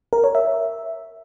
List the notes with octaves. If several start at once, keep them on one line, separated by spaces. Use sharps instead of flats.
A#4
C#5
E5